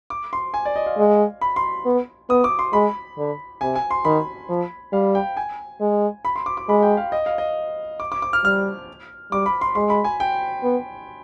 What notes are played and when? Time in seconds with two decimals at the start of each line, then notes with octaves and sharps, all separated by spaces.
0.10 D6
0.33 C6
0.54 G#5
0.65 D5
0.76 D#5
0.86 F5
0.98 G#3
1.41 B5
1.56 C6
1.85 B3
2.29 B3 D#6
2.44 D6
2.59 C6
2.73 G#3 B5
3.18 D3
3.61 C3 G#5
3.75 G#5
3.91 C6
4.05 D#3 B5
4.49 F3
4.92 G3 F5
5.15 G5
5.37 G#5
5.81 G#3
6.25 B5
6.36 C6
6.46 D6
6.57 D6
6.69 G#3 B5
6.83 G5
6.97 F5
7.12 D#5
7.26 F5
7.38 D#5
8.00 D6
8.12 D6
8.22 D6
8.33 F6
8.44 G3 F6
9.32 G3 D6
9.46 B5
9.61 C6
9.75 G#3 C6
9.90 B5
10.04 G#5
10.20 G5
10.63 B3